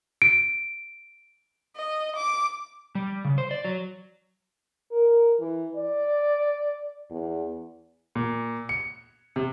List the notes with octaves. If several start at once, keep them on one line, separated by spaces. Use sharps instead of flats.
D7
D#5
D6
G3
C#3
C5
D5
F#3
A#4
E3
D5
E2
A#2
C#7
C3